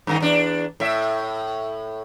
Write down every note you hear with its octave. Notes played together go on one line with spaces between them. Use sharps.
G2 D#3 D#4
E2 D4
A2 E5